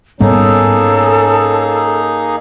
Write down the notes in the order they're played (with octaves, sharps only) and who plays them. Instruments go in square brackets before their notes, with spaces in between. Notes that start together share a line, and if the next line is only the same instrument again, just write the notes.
[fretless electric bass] G#2 G3 B3 [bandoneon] A#3 D#4 G#4 [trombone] C#4 [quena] A4